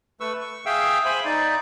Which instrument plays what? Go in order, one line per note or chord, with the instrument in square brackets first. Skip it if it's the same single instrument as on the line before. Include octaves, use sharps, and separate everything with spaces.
[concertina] A3 B4 C#6 E6
C#6
G#4 E5 F5 G5 E6
C5 E5 G#5 B5
D#4 D5